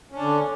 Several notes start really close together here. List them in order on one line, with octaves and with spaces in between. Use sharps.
C#4 D4 D3